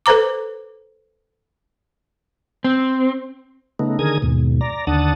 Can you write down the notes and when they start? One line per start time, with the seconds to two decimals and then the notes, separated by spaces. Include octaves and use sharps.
0.06 A4 B4 C5 A#5 D6
2.64 C4
3.79 C#3 A3 B3 D#4
3.99 D3 D#3 G#4 A#4 D#6 G#6
4.22 D#2 G#2 B2
4.61 D5 A#5
4.87 D#2 D3 D4 F#5 A5 D#6